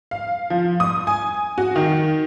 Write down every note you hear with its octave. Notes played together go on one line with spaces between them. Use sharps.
F5
F3
D#6
G#5
F#4
D#3